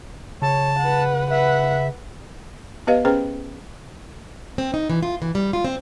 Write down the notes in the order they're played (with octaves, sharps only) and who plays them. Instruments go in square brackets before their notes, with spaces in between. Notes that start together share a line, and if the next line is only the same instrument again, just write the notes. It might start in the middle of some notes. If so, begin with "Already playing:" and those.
[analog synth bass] C#3 [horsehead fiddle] C#5 [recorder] A5
[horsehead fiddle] B4 F#5
[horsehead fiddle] B4 F#5 [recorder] E5
[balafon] B3 G4 B4 D#5 F5
C#4 G#4 B4 C5 G5 A#5
[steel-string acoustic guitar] C4
D#4
E3
F4
E3
G3
F4
C4